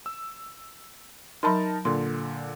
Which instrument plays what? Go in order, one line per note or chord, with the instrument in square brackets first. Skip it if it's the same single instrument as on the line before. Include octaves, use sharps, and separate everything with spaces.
[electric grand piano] E6
[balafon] F#3 B5 C6 [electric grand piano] D#4 A#4 A5
[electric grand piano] A#2 D3 [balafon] C6